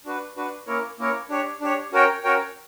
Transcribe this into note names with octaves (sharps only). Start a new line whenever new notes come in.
D4 F#4 B4
D4 F#4 B4
A#3 C#4 E4 A#4 C#5
A#3 C#4 E4 A#4 C#5
D4 G4 C#5
D4 G4 C#5
C#4 F#4 A#4 C#5 G5
C#4 F#4 A#4 C#5 G5